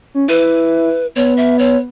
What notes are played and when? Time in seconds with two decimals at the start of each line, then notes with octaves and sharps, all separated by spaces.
0.14 C#4
0.28 E4 B4
1.16 B3 C#5
1.37 E5
1.59 C#5